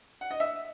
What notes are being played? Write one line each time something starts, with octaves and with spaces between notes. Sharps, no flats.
F#5
D#5
E5